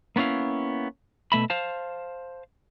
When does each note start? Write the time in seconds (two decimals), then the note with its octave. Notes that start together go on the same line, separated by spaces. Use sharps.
0.16 A#3 B3 C#4 E4 F5
1.32 B2 A3 E5 B5
1.50 C5 F5 A5